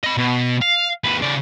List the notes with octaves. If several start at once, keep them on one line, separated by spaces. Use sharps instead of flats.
D#5 B5
B2
F5
D#2 B4
C#3 D5